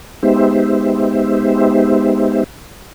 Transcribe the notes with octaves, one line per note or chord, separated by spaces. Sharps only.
G#3 B3 D#4 G4 C5 E5